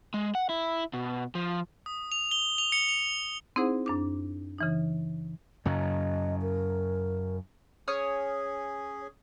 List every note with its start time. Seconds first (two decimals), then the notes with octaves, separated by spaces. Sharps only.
0.14 G#3
0.35 F#5
0.49 E4
0.93 B2
1.35 F3
1.86 D#6
2.12 F7
2.31 G7
2.58 F7
2.72 C#7
2.89 F7
3.56 C4 D#4 E4 G#4 C5 F#5
3.86 F#2 D4 D6
4.58 C#3 E3 D#4
5.65 F#2 C#3 F#3 D#5
6.42 A#4
7.88 C#4 G#4 C#5 D#6 F6